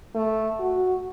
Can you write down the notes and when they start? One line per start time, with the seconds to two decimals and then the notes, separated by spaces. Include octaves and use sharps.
0.15 A3
0.60 F#4